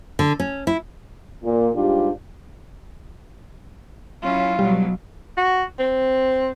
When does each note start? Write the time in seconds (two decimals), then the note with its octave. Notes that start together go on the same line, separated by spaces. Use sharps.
0.19 D3
0.39 C#4
0.67 E4
1.43 A#2
1.75 G#2 G3 D4 F4 G4
4.22 F#3 C#4 E4 F4
4.59 B2 F#3 G3
5.37 F#4
5.79 C4